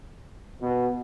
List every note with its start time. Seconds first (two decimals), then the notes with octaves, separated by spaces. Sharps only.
0.62 B2